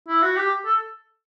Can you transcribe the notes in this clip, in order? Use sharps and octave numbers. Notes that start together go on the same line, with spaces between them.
E4
F#4
G4
A4